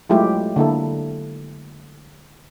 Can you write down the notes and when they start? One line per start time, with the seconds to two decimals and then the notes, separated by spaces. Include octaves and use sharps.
0.10 F#3 G#3 A3 E4 F4 G4
0.56 D3 A#3 E4 A4